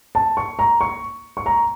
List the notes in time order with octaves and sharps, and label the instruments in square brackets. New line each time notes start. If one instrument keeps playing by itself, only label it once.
[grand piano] A5
C#6
A#5
C#6
C#6
A#5